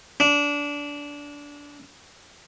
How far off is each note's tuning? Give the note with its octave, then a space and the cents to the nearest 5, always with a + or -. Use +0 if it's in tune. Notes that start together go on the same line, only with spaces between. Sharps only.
D4 -20